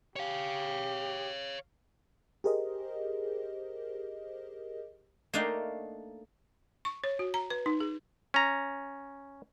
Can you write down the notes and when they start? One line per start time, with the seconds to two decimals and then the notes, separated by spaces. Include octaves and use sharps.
0.16 G4 C#5 F5
2.44 G4 G#4 A#4 C5 D#5
5.33 A3 A#3 D4 D#4 F5 G5
6.85 C#6
7.04 C#5
7.19 F#4
7.34 A#5
7.50 B4
7.66 D#4
7.80 G#4
8.34 C#4 A#5